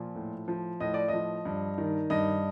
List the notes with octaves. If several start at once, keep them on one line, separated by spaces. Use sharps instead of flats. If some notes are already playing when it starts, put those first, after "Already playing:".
Already playing: A#2 F3
A2
F3
A2 D#5
D5
F3 D#5
G2
D#3
G2 D#5